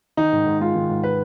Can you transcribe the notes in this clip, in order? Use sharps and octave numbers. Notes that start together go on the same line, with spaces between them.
D#3 D#4
G#2
G#2
G#3 F4
D#3
G#2
B4